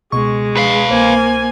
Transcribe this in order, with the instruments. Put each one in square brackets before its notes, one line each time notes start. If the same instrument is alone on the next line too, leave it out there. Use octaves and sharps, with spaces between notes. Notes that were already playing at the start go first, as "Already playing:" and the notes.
[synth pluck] C#2 B2 C#6 [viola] G#3
[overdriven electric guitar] B4 F5
[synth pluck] C2 C5 [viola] A#3 G#5